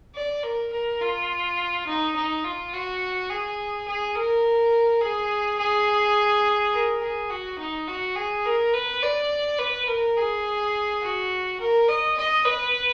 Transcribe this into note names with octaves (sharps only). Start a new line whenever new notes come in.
D5
A#4
A#4
F4
D#4
D#4
F4
F#4
G#4
G#4
A#4
G#4
G#4
A#4
G#4
F#4
D#4
F#4
G#4
A#4
B4
D5
B4
A#4
G#4
F#4
A#4
D#5
D#5
B4